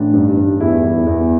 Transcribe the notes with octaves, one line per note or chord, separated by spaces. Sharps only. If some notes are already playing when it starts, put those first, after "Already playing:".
Already playing: A1 D4
G2
G2
E2 E4
E2
E2